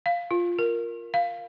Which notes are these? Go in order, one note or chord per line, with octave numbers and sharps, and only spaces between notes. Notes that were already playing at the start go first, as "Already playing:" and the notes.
F5
F4
A#4
F5